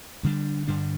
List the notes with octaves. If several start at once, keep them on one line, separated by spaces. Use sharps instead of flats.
G2 D3 G3 D4
G2 D3 G3 D4